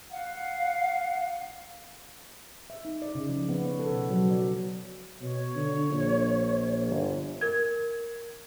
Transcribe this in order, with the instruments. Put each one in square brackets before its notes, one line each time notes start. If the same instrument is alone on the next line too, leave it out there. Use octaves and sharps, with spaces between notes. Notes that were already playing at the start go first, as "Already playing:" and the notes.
[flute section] F5 F#5
[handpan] E5
D#4
D5
C#3
F3
B3
C#5
A4
B2
F#3
D5
[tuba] B2 [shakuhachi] C#5
[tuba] D3
A#1
G1
[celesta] A#4 G#6